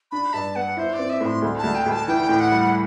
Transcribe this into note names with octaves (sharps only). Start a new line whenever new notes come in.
D4 B5
G2 A5
B3 F#5
E4 C5
D5
C4
E5
A2
C6
D2
A5
D2
G5
D2
A5
E3 G5
A2
F#5
G3